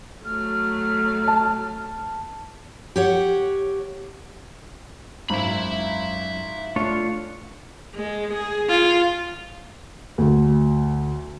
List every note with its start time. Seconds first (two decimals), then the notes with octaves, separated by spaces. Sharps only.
0.25 F#3 A3 F6
1.28 A5
2.96 G4 C#5 F#5
5.30 G#1 F#2 E5 B5
6.76 A3 D4 F4 C#5 F5
7.95 G#3
8.33 G#4
8.69 F4
10.18 D2